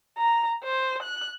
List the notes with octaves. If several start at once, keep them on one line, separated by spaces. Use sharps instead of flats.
A#5
C5
F#6